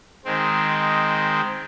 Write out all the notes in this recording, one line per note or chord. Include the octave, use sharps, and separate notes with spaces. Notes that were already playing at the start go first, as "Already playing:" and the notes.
D#3 G#3 C4